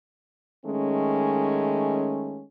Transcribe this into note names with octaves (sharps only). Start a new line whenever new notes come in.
D#3 G#3 A3 C#4